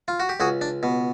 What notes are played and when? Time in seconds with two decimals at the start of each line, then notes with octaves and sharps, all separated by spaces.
0.08 F4
0.20 F#4
0.29 G4
0.40 C#2 F#4 G#4
0.61 D4
0.83 B2